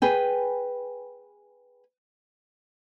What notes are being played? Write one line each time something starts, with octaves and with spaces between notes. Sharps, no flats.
G#4 B4 G5 G#5